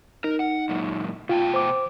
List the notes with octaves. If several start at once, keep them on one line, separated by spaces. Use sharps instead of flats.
D#4 A#4
F#5
F#2 A#2
B2 F4 G5 A5
C5 D6